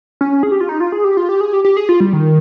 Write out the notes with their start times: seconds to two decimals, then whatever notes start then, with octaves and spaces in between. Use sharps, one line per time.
0.21 C#4
0.43 G#4
0.52 G4
0.61 F4
0.69 D#4
0.80 F4
0.92 G#4
1.04 G4
1.17 F4
1.29 G4
1.41 G#4
1.53 G4
1.65 G4
1.77 G#4
1.89 F4
2.00 G3
2.13 D#3